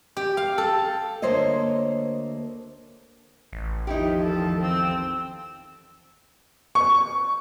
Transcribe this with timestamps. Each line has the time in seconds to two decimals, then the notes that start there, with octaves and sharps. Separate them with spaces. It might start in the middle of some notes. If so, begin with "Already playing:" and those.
0.17 G4
0.37 F5
0.58 A4
1.22 D2 A3 A#3 C5 C#5 D#5
3.53 A1
3.87 E2 D#3 F3 D#4 E4 G4
4.22 A4
4.61 C4 E6
6.75 C#6